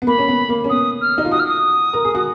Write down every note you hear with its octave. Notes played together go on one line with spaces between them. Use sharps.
B3
A#3 B5
C#4
B3
A#3
C#4
B3 D#6
F6
D#4
F4
F#4 D#6
F6
D#6
A#4
G#4
F#4